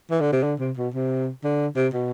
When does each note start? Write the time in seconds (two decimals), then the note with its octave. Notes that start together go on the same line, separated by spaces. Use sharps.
0.11 E3
0.21 D3
0.33 C3
0.43 D3
0.60 C3
0.77 B2
0.94 C3
1.44 D3
1.76 C3
1.93 B2